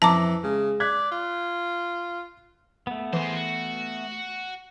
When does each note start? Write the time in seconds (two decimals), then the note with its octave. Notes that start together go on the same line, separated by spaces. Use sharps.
0.02 F2 E3 E5 A5 A#5 D6 A#6
0.43 C#3 G#3
0.80 D5 F#6 G#6 B6
1.11 F4
2.87 A3 B3
3.13 E3 G#3 C5
3.35 F#4